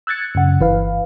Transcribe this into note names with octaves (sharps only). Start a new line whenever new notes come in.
E6 F#6 G#6 A6 C#7
F#2 C#3 F#5
G1 E3 B4 F5